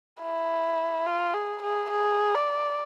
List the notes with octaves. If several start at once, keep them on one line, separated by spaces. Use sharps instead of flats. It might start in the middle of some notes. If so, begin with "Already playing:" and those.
E4
F4
G#4
G#4
G#4
D5